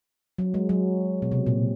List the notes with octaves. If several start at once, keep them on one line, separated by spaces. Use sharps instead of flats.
F#3
G#3
F#3
B2
C3
A#2